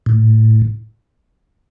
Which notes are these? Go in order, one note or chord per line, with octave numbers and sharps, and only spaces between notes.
A2